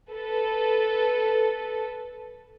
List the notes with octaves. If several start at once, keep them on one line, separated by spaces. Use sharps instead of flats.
A4 B4